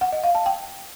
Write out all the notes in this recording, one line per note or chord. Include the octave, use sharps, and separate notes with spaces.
F#5
D#5
F5
A5
G5